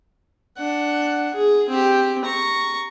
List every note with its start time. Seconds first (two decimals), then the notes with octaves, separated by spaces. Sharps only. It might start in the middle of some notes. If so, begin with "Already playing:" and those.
0.57 D4 F#5
1.34 G#4
1.69 C4 G4
2.25 A#5 C#6